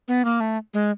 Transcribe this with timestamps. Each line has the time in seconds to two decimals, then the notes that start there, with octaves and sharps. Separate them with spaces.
0.08 B3
0.25 A#3
0.40 A3
0.74 G#3